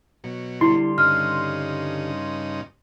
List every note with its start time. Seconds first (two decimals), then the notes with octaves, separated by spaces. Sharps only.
0.24 B2 F#3
0.61 D3 G3 E4 C6
0.98 G2 C#3 D#4 F6